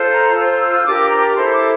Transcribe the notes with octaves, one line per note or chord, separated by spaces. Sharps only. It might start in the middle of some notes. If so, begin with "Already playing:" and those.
Already playing: F4 A4 C5
A#5
F4 C5 E6
E6
D4 G4 A#4 D6
A#5
E4 A4 C5 C6
D6